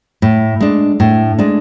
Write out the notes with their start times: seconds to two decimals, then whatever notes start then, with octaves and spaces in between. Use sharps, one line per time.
0.22 A2
0.60 G#3 D4
1.00 A2
1.39 G#3 D4